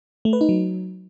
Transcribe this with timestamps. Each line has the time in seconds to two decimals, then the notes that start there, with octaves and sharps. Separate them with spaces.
0.25 A3
0.33 B4
0.41 D#4
0.49 F#3